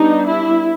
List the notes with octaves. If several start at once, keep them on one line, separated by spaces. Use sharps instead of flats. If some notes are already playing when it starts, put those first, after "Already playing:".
Already playing: G3 B3 D4 D#4
E4